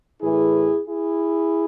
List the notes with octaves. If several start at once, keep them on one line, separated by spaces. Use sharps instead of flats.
A2 E3 E4 G#4
E4 G#4